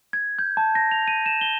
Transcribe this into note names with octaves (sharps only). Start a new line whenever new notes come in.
G#6
G6
A5
A#6
F7
D#7
E7
G7